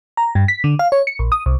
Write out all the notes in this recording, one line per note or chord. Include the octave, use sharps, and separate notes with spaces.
A#5
G2
B6
D3
F5
C#5
C#7
A#1
D#6
C2